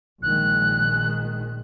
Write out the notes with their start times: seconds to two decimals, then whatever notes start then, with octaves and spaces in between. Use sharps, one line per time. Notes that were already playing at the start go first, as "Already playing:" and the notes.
0.23 A#1 D#3 G#3 F#6